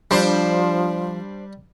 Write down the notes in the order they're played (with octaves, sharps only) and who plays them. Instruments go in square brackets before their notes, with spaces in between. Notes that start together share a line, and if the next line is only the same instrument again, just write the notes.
[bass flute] F3 [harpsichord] G3 [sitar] D4 C5